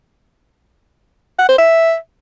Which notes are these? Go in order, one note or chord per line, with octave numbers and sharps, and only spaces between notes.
F#5
C5
E5